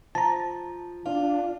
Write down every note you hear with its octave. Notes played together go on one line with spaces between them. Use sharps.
F3 A5 A#5
D4 F4